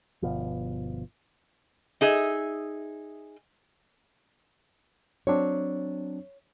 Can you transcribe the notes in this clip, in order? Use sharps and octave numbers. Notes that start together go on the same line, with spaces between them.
G1 B2 F3
D#4 G#4 E5
F#3 C4 D4 C#5